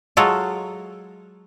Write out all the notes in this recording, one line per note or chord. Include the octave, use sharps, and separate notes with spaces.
F#3 G#3 F4 A4